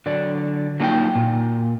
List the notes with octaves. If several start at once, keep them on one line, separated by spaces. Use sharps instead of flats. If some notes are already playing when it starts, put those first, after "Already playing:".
D3 F#3 D5
F#3 A#3 D4 D#4 F4 G5
A#2